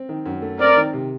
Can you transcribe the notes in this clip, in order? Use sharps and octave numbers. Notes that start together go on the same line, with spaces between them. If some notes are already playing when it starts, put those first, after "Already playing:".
Already playing: C4
D#3
F#2
A3
C4 A#4 D5
D#3
C3